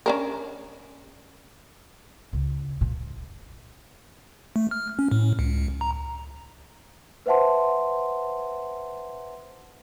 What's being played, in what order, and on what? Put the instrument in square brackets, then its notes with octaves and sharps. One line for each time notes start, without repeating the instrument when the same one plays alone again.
[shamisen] C#4 D4 A#4
[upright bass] C#2
A#2
[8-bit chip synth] A3
F6
C#4
A2
C#2
A#5
[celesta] B4 C5 E5 F#5 A5 C6